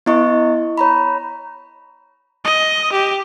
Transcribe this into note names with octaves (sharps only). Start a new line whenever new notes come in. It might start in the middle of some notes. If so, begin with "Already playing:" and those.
B3 E4 D#5 C#6
C#5 A#5 B5
D#5
G4